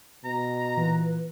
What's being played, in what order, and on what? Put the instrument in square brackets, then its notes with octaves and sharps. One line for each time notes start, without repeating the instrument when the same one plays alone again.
[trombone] B2 [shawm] A#5
[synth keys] A#2 E3 F4 [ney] B4